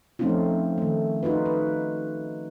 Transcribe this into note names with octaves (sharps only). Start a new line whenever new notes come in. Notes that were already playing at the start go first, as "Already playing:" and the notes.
F3 A3 C4 C#4 D#4 F4
D#3 A3
D#4 F4 F#4 B4
B4